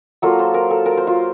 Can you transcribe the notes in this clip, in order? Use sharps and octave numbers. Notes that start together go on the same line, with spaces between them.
F#3 A#3 F4 A4
C5
A#4
A4
A#4
C5
F4